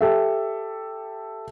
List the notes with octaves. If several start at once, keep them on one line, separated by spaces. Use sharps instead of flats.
G4 A4 E5